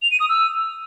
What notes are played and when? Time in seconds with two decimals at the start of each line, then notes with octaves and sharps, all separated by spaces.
0.02 F7
0.11 D#7
0.20 D#6
0.29 E6